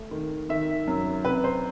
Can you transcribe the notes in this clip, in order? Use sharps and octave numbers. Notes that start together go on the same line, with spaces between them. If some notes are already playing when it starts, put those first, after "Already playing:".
Already playing: A3
D#3
D#3 E5
F#2
C3 B4
C5